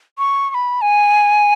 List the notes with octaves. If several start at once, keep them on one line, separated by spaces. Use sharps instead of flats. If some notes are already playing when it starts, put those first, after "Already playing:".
C#6
C#6
B5
G#5